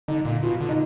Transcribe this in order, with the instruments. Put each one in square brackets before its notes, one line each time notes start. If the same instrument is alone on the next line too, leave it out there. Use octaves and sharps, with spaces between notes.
[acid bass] D3 [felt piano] D#4
[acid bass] A#2
[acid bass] B2 [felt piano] F4
[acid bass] D3
[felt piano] D#4